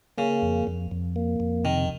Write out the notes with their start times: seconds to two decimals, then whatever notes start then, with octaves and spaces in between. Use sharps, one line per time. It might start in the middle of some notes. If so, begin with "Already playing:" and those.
0.18 C#3 A#3
0.42 F2
0.67 F2
0.91 F2
1.16 A#3
1.40 F2
1.64 C3 D#3